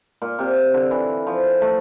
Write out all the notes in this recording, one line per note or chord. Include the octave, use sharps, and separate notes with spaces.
A#2
C3
D3
E3
F3
A3